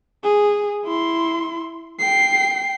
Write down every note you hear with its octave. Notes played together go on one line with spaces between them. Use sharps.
G#4
E4 C6
G5 C7